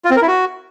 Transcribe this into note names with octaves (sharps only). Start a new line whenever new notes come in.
F4
C4
A#4
E4
F#4